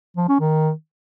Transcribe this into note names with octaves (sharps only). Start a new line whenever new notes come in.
F3
C#4
D#3